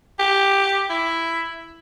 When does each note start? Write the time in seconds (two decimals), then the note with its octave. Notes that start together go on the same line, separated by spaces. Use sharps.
0.19 G4
0.90 E4